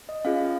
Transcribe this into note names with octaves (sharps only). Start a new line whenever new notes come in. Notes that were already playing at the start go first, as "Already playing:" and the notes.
D#5
C#4 F4 G#4 F5